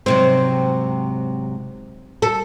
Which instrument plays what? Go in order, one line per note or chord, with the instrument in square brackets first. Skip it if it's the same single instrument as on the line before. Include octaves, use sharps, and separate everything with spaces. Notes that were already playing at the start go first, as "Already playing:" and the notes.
[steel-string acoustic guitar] G#2 C3 F#3 [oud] C4
[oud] A4